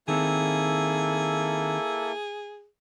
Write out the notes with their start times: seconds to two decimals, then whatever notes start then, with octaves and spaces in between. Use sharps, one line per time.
0.08 D#3 A#3 C4 E4 G#4 A4